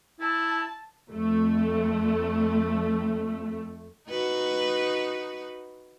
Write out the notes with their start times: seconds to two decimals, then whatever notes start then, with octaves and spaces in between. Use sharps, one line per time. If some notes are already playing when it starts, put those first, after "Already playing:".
0.20 E4 A5
1.11 F2 A3
4.10 D#4 F#4 B4